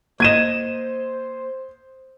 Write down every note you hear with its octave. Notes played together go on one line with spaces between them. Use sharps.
A#3 C5 D#5 G#6 D#7 E7